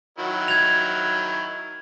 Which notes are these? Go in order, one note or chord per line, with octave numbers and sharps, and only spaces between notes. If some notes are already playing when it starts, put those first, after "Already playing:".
D#3 F#3 E4
G#6 F7